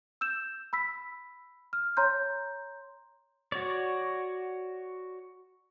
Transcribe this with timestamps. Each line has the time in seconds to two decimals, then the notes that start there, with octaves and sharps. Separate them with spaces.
0.21 E6 G6 E7
0.73 B5 E6 B6
1.73 F6
1.97 C#5 A#5 C6 G6
3.52 F#4 C#5 D5